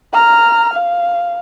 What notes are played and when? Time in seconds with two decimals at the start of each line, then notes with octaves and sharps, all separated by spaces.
0.13 A#5 F6
0.73 F5